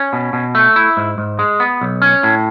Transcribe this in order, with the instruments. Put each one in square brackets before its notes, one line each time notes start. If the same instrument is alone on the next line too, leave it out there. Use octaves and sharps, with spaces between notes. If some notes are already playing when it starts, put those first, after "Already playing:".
Already playing: [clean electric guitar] C#4
B2
B2
A3
E4
G#2
G#2
G#3
B3
B1
C#4
A2